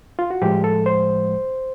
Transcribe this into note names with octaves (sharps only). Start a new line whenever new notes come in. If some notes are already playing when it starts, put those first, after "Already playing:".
F4
F#4
A2 F3 G#3 G4
A4
C5